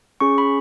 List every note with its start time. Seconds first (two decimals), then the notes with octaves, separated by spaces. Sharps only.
0.20 C#4 G#4 C#6
0.38 B5